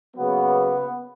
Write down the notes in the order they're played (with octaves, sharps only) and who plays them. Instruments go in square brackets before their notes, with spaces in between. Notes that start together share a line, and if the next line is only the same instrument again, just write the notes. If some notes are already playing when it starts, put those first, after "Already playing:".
[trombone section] C#3 F#3 A#3 B3